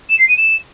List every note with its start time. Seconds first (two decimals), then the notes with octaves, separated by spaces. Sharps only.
0.09 E7
0.19 C7
0.28 D#7
0.37 E7